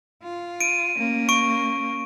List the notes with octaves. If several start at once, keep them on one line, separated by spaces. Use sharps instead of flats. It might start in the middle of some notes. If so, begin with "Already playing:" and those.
F4
D7 D#7
A#3 C#4
C#6 D7